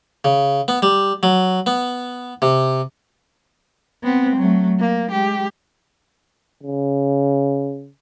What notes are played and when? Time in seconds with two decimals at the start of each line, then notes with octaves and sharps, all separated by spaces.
0.25 C#3
0.68 B3
0.82 G3
1.23 F#3
1.66 B3
2.42 C3
4.03 B3 C4
4.36 F#3 A3
4.79 A#3
5.11 G#3 G4
6.63 C#3